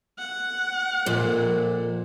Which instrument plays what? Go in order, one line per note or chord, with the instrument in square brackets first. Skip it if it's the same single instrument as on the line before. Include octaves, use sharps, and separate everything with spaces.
[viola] F#5
[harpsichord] A#1 F2 [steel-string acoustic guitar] A#2 [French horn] A#4